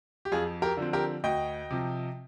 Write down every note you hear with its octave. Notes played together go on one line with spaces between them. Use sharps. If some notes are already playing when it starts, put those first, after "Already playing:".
G4
F2 F4 G#4
G4 A#4
D3 F3 C4
G4 A#4
D2 D#5 G5
C3 F3